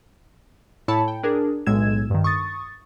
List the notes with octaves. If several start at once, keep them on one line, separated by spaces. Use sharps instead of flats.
A2 E4 C#5 A5 B5 C#7
G5
D4 G#4 A#4
B1 A2 G#3 E6 G#6 E7
G2 D#3
C#6 D#6 A6